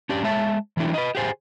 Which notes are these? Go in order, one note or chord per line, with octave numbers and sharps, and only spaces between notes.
C#4 D4 G4
G#3 C#5 E5 A5
E3 F#3 A3 D4 E4
B4 D#5
G4 G#4 C5 G#5